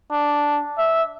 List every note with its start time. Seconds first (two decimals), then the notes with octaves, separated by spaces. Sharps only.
0.12 D4
0.78 E5